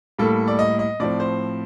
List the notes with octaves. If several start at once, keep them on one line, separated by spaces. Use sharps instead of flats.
A2 G3 A#3 A4
D5
D#5
D#5
A2 F3 C4 D5
C5